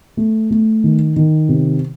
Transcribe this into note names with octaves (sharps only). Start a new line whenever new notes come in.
A3
A3
D#3
D#3
C3